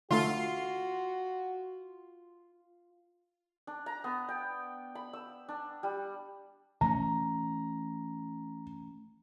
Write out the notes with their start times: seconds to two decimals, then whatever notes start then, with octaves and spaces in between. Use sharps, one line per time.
0.11 D3 A3 F4 F#4
3.67 D4
3.86 A#5
4.04 B3
4.29 G5
4.95 B5
5.13 E6
5.49 D4
5.83 G3
6.81 E3 A3 C#4 A#5